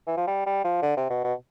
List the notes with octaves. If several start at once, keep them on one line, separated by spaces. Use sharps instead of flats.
E3
F3
G3
G3
F3
D3
C3
B2
B2